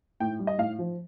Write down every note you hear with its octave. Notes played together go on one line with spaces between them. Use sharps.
A2 G5
G3
D#5
A2 F5
F3